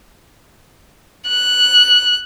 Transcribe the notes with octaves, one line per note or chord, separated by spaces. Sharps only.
F#6